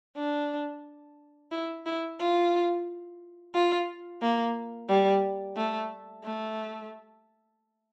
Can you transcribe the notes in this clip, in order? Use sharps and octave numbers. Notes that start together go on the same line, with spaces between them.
D4
E4
E4
F4
F4
A#3
G3
A3
A3